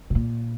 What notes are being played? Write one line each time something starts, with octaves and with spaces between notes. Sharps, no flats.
B2
A#2